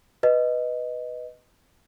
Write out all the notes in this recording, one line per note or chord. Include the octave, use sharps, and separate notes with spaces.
B4 D#5